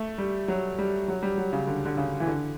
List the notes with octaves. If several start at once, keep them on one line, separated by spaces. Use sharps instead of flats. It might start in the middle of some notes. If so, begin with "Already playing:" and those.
Already playing: A3
G3
F#3
G3
F#3
G3
F#3
C#3
D3
D3
C#3
E3
D3